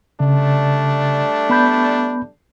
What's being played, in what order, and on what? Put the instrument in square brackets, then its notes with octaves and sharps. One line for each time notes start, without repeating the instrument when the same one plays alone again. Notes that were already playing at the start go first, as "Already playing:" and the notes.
[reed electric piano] C#3 [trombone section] G3 A3 D4
[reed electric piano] B3 B5 G6